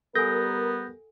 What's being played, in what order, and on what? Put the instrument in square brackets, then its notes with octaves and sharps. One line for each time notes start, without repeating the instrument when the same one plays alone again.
[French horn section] G3 A#4 [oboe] B3 [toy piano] A4 F#5 G#5 [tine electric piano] G6 A#6